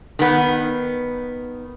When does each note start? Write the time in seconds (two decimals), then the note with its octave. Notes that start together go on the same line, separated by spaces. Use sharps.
0.19 D#3 B3